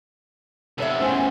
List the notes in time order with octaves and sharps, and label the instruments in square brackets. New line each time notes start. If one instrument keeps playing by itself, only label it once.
[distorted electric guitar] C3 A4 [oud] B3 C#5 E5
[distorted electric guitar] A2 C#3 [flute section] C5 G#5